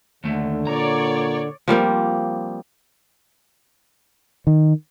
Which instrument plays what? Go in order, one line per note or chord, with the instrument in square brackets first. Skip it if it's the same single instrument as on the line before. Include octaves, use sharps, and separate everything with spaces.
[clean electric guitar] D#2 A3 [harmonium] D3
[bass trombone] A#2 [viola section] C#5 D5 [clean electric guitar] A#5
[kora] F3 G3 A#3 C4
[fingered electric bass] D#3